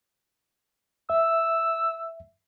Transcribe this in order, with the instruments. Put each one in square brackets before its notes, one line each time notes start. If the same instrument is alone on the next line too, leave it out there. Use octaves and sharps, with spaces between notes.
[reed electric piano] E5 [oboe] E6